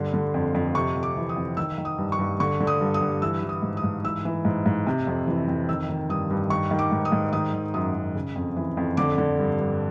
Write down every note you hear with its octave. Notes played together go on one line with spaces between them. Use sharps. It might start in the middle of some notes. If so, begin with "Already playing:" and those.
Already playing: G2 D3 C6
D3
F2
F2
C3 C#6
F2
D6
E3
D#6
F2
D#3 E6
D#3
D#6
G2
C#6
G2
D3 C#6
D3
D#6
G2
D#6
G2
E3 E6
E3
D#6
G#2
D#6
G#2
E3 E6
E3
G#2
G#2
C3
F2
E3
F2
D#3 E6
D#3
G2 D#6
G2
D#3 C#6
D#3
D6
G#2
D#6
G#2
D#3 D#6
D#3
F#2 D#6
F#2
C#3
F2
E3
F2
D3 D6
D3
G2
G2